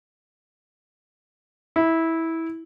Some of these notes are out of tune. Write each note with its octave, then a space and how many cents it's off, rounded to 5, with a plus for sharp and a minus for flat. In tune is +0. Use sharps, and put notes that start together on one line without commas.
E4 -15